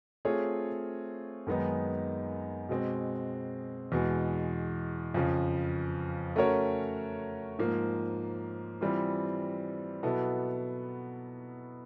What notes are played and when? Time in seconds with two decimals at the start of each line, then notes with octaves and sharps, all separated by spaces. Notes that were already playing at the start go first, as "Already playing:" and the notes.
0.25 A3 C4 F4 G#4 C#5
1.47 F#2 D#3 G#3 B3 D#4
2.69 B2 G#3 C4
3.92 E2 B2 G#3
5.14 F2 C#3 F3
6.36 A3 C#4 F#4 A#4 C#5
7.59 G#2 F3 A#3
8.81 E3 G3 C4 F4
10.03 B2 F#3 B3 E4 A4